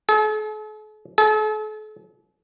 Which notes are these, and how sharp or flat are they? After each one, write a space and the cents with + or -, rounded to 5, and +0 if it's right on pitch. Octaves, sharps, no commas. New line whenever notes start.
A4 -45
A4 -40